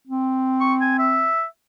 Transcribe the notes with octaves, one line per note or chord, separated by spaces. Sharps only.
C4
C#6
G#5
E5